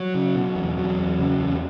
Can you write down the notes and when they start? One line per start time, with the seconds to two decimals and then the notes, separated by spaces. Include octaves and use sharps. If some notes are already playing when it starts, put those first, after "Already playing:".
Already playing: F#3
0.15 C#3
0.35 B2
0.56 E2
0.77 E2 F#3
0.99 E2
1.19 C#3
1.40 E2